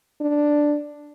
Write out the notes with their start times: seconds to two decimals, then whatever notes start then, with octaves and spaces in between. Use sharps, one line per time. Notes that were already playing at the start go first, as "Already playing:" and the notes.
0.21 D4